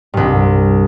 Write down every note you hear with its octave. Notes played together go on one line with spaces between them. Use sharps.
C2 G2